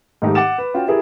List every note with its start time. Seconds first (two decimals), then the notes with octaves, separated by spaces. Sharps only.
0.22 G#2 D#3 A3 D#4 G4
0.35 F#5 D6 A6 E7
0.58 B4
0.74 C#4 F4 F#4 G5
0.88 E4 G4 G#4 A#4